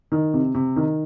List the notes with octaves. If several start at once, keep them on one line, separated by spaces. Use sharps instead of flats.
D#3
C3
C3
D#3